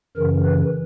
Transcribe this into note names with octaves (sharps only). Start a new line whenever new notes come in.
F#2 C#3 E3 A#4
B4